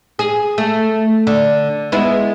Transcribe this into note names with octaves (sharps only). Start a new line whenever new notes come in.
G#4
A3
D3
G#3 B3 E4